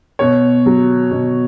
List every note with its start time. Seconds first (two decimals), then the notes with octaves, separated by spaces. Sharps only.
0.19 B2 C#5
0.66 F#3
1.11 B2